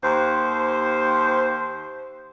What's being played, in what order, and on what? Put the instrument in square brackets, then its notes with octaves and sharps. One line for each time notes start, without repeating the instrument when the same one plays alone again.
[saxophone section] D#2 C5